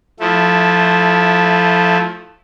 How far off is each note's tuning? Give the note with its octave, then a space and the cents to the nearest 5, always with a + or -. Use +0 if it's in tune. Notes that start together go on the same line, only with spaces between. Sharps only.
F3 +15 A3 -15 E4 +0